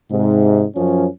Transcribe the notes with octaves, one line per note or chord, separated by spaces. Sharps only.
G#2 C3
F#2 F3 C#4